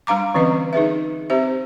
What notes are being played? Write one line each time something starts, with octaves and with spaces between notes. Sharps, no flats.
G3 D4 F5 A#5 D6
D3 E3 C4 C#4 B4 D#5
D#4 G#4 B4 E5
C4 G4 C5 E5